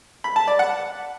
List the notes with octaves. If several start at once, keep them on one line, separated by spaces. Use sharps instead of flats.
B5
A5
D5
F#5